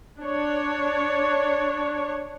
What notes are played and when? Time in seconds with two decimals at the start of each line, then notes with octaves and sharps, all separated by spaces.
0.19 D4 C#5